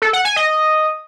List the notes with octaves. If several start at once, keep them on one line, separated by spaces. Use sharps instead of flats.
A4
F#5
G#5
D#5